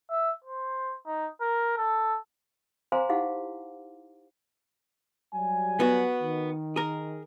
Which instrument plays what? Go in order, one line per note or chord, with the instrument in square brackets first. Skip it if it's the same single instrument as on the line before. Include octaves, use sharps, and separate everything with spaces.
[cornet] E5
C5
D#4
A#4
A4
[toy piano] C5 F5 G#5 A#5 C6 D6
D#4 E4 G4 F5 F#5 D6
[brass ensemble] F#3 G3 G#5
[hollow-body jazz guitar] B3 F#4
[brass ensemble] D#3
[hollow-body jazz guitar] G#4 A#4